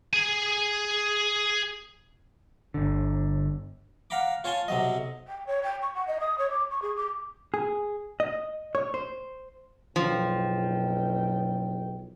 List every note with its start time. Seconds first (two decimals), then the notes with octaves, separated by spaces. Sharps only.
0.13 G#4 G#5
2.74 G1 D3
4.10 F5 F#5 A#5 B5 D6
4.44 F4 C#5 G#5 A5 C6
4.68 B1 C3 F#3 D#5
5.28 G5
5.47 C#5
5.63 G5
5.82 C#6
5.95 F#5
6.07 D#5
6.21 D#6
6.39 C#5
6.50 D6
6.71 C#6
6.82 G#4
6.97 D6
7.54 G#4
8.20 D#5
8.75 C#5
8.94 C5
9.96 F#1 B1 F3 G5